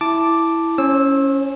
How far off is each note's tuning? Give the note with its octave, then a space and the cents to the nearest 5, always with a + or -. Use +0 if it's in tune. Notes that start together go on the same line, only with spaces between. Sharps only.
E4 +0 A5 +0 D6 +0
C#4 +0 C5 +45 E6 -10